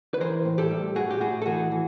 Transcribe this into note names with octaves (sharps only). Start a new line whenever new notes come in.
B4
E3 A#4 C5
A2
G4 A4
G3
A2 F#4 G#4
G4
A2 F#4 G#4
A4
E3 F#4 G#4
E3